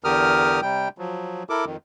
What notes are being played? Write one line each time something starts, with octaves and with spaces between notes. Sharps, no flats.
E2 D3 G4 A#4 D#6 F6
C3 G3 G5
F3 F#3
E4 A4 A#4 D6
F2 D#3